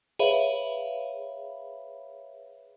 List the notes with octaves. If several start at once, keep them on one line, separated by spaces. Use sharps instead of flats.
G#4 B4 C#5 E5 F5 B5